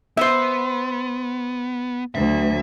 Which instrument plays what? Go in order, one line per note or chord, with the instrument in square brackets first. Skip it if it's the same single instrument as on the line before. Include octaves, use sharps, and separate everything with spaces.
[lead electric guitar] B3 [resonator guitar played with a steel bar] C5 E5
[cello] D2 F#3 [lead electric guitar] E5